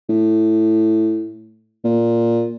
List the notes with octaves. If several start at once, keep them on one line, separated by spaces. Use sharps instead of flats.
A2
A#2